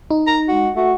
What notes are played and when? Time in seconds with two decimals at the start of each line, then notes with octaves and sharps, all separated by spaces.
0.11 D#4
0.27 A#5
0.48 G#3 F#4
0.76 A3 F#4